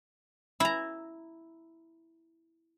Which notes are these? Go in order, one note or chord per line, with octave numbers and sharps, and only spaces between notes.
E4 A#5